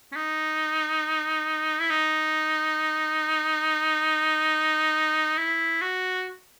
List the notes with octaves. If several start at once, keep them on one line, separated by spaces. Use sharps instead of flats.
C#4
D#4
E4
D#4
E4
F#4